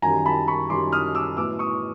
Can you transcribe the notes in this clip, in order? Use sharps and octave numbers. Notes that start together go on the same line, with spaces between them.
F#2 D#3 G3 G#5 A#5
A5 B5
B5 C#6
F#2 D#3 G3 C6 D6
D#6 F6
D6 E6
A2 F#3 B3 E4 D6 E6
C#6 D#6